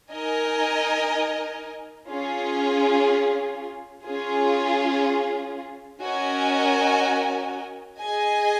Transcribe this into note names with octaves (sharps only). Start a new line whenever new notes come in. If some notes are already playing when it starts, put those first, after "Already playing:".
D#4 A#4 D#5 G#5
C#4 F4 G#4
C#4 F4 G#4
C#4 F#4 A#4 D#5 G#5
G#4 D#5 G#5